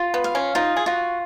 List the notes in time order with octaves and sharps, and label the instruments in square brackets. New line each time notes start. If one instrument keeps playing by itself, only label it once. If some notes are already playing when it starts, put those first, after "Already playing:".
Already playing: [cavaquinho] F4
[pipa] B3
[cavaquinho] F5
[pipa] C#4
[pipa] D#4 [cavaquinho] F4
[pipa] G#4
[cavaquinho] F4 [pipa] F#4